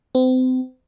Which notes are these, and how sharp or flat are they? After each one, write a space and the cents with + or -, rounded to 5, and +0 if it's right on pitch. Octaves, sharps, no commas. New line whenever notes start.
C4 -35